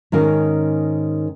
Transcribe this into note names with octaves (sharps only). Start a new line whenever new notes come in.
G#2 D#3 C#4 A#4